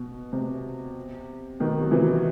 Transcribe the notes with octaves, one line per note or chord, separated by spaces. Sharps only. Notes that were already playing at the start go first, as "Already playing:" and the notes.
Already playing: B2
C3
B2 D#3
F#3
C3 E3